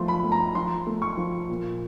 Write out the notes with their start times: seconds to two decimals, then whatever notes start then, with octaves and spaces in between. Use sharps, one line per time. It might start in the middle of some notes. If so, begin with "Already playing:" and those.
Already playing: F3 A3 C6
0.08 B5
0.24 A3
0.32 A#5
0.55 F3 C6
0.87 A3
1.02 C#6
1.17 F3
1.49 A#2